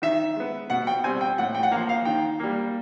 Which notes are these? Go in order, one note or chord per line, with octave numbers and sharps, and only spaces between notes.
D#3 E5
G#3 B3
B2 F#5
G5
G3 C4 G#5
G5
A2 F#5
G5
F#5
F3 A#3 F5
F5
D#3 G5
G3 A#3